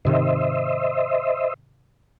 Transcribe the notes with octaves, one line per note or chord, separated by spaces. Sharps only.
G#2 C3 D#3 C5 D#5 E5